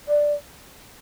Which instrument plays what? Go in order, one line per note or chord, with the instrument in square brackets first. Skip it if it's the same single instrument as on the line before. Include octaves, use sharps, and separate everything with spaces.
[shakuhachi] D5